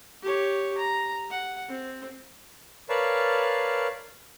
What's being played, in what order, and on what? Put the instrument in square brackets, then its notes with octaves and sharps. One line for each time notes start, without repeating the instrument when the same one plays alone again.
[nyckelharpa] G4 C#5
A#5
F#5
C4
[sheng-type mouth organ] A#4 B4 C#5 D5 F5 A5